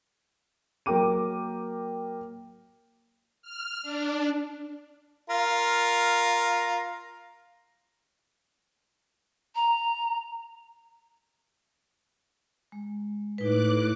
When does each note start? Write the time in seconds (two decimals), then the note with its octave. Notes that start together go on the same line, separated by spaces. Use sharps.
0.86 F#3 A#3 A#4 G5 D6 D#7
3.42 F6
3.83 D4
5.30 F4 A#4
9.55 A#5
12.72 G#3
13.38 A2 D#4 B4 D6 F#6